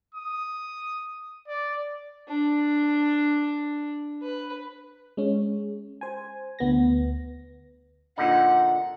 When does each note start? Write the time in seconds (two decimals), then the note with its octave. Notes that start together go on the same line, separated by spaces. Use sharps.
0.14 D#6
1.48 D5
2.28 D4
4.22 B4
5.17 G#3 C#4
6.01 C5 G#5
6.59 D2 B3 A#6
8.18 A#2 D3 D#4 F#5